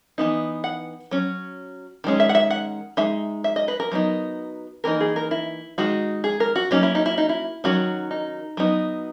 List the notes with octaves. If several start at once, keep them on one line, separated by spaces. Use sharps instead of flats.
E3 B3 D#4
F#5
F#3 C#4
D#3 G#3 C#4
E5
F#5
E5
F#5
G#3 D#4 E5
E5
D#5
B4
A#4
F#3 B3 D#4
E3 A#3 D#4 A#4
G#4
A#4
E4
D#3 G#3 D#4 F#4
G#4
A#4
F#4
F#3 A#3 C#4 D#4
E4
D#4
E4
D#4
E4
D#3 F#3 C#4 F#4
D#4
F#3 B3 D#4